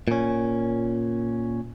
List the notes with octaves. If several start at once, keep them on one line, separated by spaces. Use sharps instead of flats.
A#2 C#4